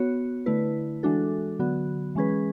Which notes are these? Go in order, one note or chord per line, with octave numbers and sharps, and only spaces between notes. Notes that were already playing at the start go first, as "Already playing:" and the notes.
Already playing: B3 F#4 C#5
D3 A3 E4 B4
E3 G#3 D4 F#4 A4
D3 F#3 B3 F#4
E3 G#3 C#4 G#4 B4